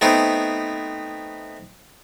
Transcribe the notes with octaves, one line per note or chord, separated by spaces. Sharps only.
A3 B3 C4 D#4